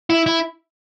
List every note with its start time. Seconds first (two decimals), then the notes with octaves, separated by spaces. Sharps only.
0.10 E4
0.26 E4